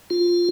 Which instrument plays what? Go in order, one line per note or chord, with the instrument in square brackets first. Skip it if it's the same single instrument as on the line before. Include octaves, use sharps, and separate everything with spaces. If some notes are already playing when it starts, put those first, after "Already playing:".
[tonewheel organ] F4